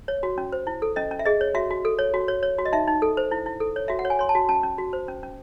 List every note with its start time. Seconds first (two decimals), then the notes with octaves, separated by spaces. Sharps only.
0.08 C#5
0.23 F#4
0.38 C#4
0.52 C5
0.67 E4
0.82 A4
0.96 C#4 D#5
1.11 C#4
1.19 E5
1.25 G#4 D#5
1.41 C#5
1.55 F#4 E5
1.70 F#4
1.85 A4
1.99 C#5
2.14 F#4
2.28 C#5
2.43 C#5
2.59 F#4
2.65 D#5
2.72 D#4 E5
2.88 D#4
3.02 A4
3.17 C5
3.31 E4
3.46 E4
3.60 A4
3.76 C#5
3.88 F#4 E5
3.99 F#5
4.05 C#5
4.10 G#5
4.19 C#5 C6
4.29 A5
4.35 F#4
4.49 C#4 A5
4.63 C#4
4.78 F#4
4.93 C5
5.08 C#4
5.23 C#4